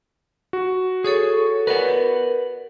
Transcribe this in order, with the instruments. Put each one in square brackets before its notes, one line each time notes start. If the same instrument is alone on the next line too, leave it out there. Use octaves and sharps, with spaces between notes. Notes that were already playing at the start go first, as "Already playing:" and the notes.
[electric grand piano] F#4
[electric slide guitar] G#4 [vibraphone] A4 C#5 C#6
[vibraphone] A#4 [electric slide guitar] B4 D5 F#5